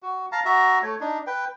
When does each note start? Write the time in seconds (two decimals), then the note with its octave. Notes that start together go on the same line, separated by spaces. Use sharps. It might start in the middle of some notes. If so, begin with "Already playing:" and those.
0.03 F#4
0.32 F5 A5 A#5
0.45 F#4 E5 A#5
0.83 A3 C#5
1.01 D4 D#4
1.27 B4 G5